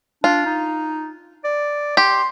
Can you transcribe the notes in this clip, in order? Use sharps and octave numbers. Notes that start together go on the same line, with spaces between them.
D4 F4
D#4
D5
G4 C6